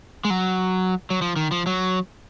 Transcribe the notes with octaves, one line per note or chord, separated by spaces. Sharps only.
G#3
F#3
F#3
F3
D#3
F3
F#3